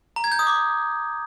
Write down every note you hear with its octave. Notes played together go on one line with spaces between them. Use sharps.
A#5
G#6
G6
D#6
D6